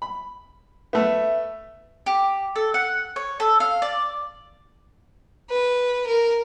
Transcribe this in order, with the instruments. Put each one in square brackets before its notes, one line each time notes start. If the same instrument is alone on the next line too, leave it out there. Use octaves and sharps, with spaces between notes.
[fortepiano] B5
[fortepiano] A3 B3 [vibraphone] E5
[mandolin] G4
A4
F#5
C#5
A4
F5
D5
[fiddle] B4
A#4